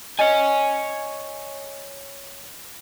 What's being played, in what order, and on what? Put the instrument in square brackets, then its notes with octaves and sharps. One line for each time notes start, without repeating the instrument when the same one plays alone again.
[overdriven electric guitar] C#5 G#5 [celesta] D#5